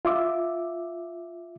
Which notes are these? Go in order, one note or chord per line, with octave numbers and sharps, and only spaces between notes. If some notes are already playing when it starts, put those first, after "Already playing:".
F4 E5 D6